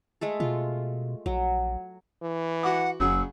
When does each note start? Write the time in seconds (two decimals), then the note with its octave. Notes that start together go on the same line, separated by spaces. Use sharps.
0.21 G#3 A3 A4
0.40 B2 F4
1.26 A#1 F#3
2.23 E3
2.63 F#4 F#5 D6
3.00 F#1 C#3 F#3 G#4 E6